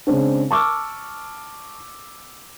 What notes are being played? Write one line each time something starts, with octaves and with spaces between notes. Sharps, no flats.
C#3 G#3 C4 D4
A5 C#6 D6 E6 F6